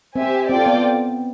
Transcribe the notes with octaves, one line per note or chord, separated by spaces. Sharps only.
C4 G4 C5 E5 G#5
C4 F4 A4 D5 G5
B3